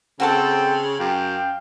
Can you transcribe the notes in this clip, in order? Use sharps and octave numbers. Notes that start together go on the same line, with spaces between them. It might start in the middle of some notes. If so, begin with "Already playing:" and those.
C#3 C4 F#4 A4 C5 G5 A5
F#2 F5 G5